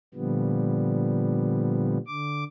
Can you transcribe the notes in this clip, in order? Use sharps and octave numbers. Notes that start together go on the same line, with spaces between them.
A#2 D3 F3 G3 B3
D3 D6